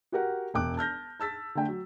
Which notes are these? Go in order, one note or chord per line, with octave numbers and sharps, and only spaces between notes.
F#4 G4 A#4 F#5
E1 G5 D6 F#6
A5 F6 G6 A#6
A5 E6 A6 B6
D3 A3 G5
F#3